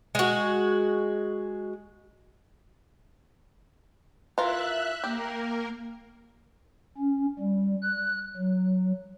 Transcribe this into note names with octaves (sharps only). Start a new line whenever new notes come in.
G#3 F#4
E3 F4 A#4 E5 F#6
A#3 G4 A#4
C#4
G3
F#6
F#3